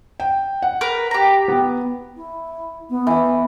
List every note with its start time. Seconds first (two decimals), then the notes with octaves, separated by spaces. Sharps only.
0.20 G5
0.62 F#5
0.81 A#4 B4
1.11 G4 A#5
1.48 B3
2.17 E4
2.90 B3
3.07 E3